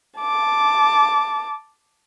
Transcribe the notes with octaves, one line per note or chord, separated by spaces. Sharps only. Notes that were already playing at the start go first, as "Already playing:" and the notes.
A5 D6